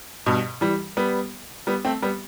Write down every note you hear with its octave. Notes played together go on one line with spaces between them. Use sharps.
G2 B2
E3 G3
G3 B3
G3 B3
A3 C4
G3 B3